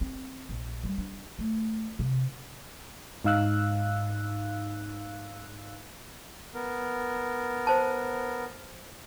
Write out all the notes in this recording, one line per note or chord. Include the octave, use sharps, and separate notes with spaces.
C4
A#1
G3
D4
A3
C3
G#2 D#4 F5 E6 F#6
B3 A#4
C5 A5